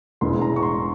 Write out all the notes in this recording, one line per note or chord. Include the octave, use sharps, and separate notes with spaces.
E1 E2 E3 G#3 C6
A#5
C#6
C6